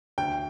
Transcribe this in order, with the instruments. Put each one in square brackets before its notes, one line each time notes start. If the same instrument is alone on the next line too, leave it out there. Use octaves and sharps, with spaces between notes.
[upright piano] D2 G5